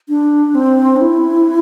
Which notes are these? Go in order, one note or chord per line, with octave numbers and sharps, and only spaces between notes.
D4
C4
D4
E4